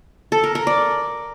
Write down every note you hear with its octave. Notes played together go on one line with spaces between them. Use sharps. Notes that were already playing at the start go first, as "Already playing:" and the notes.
A4
A#4
A#4
D5